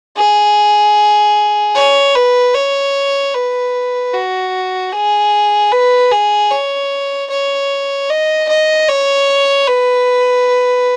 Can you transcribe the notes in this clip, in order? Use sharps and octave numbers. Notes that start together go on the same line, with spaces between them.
G#4
C#5
B4
C#5
B4
F#4
G#4
B4
G#4
C#5
C#5
D#5
D#5
C#5
B4